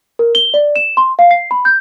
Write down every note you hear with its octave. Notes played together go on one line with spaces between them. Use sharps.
A#4
G7
D5
E7
C6
F5
C7
B5
G6